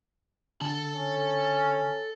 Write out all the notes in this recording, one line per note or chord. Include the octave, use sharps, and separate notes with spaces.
D3 A4 A5
C#4